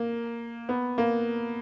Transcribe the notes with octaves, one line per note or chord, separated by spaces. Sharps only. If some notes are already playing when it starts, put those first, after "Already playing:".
Already playing: A#3
B3
A#3